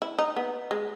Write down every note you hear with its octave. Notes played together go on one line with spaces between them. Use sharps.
E4
D#4
B3
G#3